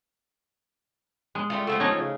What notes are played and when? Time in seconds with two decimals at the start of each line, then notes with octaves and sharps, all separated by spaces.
1.35 G#3
1.50 G3 A3 F4
1.67 F3 A3 F4 F#4
1.80 A3 C#4 D#4 C#5
1.98 C#3